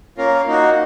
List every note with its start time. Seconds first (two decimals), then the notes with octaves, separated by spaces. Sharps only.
0.17 A#3 C#4 F4 A#4
0.46 A#3 D#4 F#4